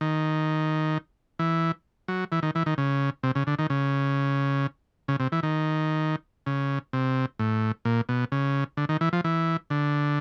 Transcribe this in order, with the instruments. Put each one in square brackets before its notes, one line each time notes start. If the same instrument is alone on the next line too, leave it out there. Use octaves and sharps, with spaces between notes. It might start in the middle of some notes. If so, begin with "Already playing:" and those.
[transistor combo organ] D#3
E3
F#3
E3
D#3
E3
D#3
C#3
C3
C#3
D3
D#3
C#3
C#3
C3
E3
D#3
C#3
C3
A2
A#2
B2
C#3
D3
D#3
E3
F3
E3
D3